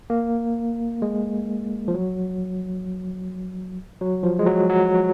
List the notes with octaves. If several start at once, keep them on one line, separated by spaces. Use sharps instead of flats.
A#3
G#3
F3
F#3
F#3
F3
G#3
F#3
F#3